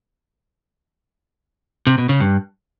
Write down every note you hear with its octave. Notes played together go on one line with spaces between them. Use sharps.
C3
B2
C#3
G2